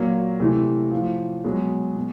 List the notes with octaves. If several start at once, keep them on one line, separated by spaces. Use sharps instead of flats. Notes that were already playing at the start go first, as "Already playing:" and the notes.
Already playing: A#2 F#3 A#3
C3 E3 A3
A2 F3
B2 F#3 G#3
B2